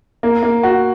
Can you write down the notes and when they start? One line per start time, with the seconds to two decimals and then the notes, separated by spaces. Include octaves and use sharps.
0.23 A#3
0.43 A#3
0.63 F#4